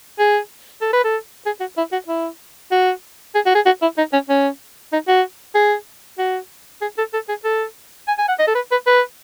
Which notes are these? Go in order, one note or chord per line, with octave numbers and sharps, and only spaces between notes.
G#4
A4
B4
A4
G#4
F#4
E4
F#4
E4
F#4
G#4
F#4
G#4
F#4
E4
D#4
C#4
C#4
D#4
F#4
G#4
F#4
G#4
A4
A4
G#4
A4
G#5
G#5
F#5
D#5
A4
B4
B4
B4